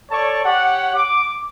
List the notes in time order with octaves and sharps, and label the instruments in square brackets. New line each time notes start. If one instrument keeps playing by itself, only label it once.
[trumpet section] A4 C#5 D5 A5 C#6
G4 C#5 F#5
D6